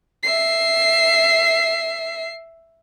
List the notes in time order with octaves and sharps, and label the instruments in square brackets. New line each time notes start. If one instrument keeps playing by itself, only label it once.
[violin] E5 C7